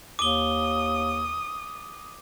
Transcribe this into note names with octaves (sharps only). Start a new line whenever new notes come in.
D#2 D6 D#6 G7